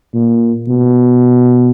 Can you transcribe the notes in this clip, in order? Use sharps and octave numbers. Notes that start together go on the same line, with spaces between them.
A#2
B2